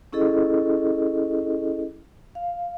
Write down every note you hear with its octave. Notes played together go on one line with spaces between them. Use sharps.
C#4 E4 G#4 A4 D#5
F5